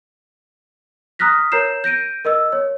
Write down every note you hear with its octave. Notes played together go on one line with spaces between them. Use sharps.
A#5 D#6 F6 F#6 A#6 B6
A#4 C#5 A#5 G6 C7 E7
G6 A#6 D7 D#7
A#4 D#5 E6
C#5